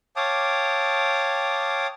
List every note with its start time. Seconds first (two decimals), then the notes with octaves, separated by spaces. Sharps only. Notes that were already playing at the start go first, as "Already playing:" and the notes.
0.16 C#5 F5 G5 A5 D6 D#6